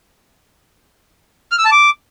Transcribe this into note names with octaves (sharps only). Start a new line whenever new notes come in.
F6
E6
A5
D6